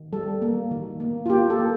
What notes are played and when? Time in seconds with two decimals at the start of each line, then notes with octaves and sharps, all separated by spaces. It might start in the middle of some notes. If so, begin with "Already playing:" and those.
Already playing: D#3
0.13 G3 A4
0.42 A#3
0.71 D#3
1.00 A#3
1.26 F4
1.29 A#3 G4
1.50 A4
1.59 A#3